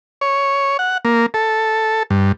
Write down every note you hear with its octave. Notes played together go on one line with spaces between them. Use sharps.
C#5
F#5
A#3
A4
G2